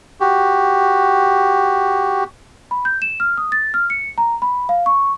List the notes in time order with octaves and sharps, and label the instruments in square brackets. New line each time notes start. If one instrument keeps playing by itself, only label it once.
[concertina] F#4 G4
[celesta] B5
G6
E7
F6
D#6
A6
F6
C#7
A#5
B5
F5
C#6